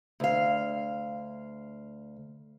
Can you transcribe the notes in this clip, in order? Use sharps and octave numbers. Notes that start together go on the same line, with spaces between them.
D2 F5